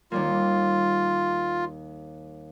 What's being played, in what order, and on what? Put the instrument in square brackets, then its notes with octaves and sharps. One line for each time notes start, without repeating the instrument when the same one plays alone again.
[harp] D#2 G3 A#3 [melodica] F4